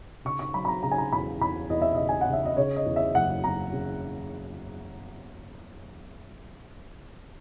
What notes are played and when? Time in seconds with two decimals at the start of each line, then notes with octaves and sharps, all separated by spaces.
0.25 C#3 C#6
0.39 C#6
0.54 F#3 B5
0.65 B5
0.68 A#5
0.83 C#3 A#5
0.91 G#5
0.98 A#5
1.13 E2 B5
1.41 E2 B5
1.70 E2 D#5
1.82 E5
1.95 C#3 D#5
2.09 G#5
2.21 F#5
2.27 C#3
2.33 E5
2.45 D#5
2.57 C#3 C#5
2.76 D#5
2.86 E2
2.96 E5
3.15 F#1 F#5
3.44 F#1 A#5
3.73 C#3